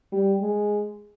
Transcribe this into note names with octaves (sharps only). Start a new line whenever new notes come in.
G3
G#3